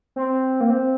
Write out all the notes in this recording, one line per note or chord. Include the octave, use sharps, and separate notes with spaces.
C4
A#3
C4